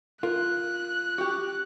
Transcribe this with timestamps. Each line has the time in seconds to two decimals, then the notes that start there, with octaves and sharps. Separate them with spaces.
0.23 F4 A#4 F#6
1.18 F#4 G4